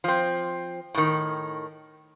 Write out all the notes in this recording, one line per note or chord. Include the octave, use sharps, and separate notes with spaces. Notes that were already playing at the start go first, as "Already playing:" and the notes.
F3 C4
A2 D#3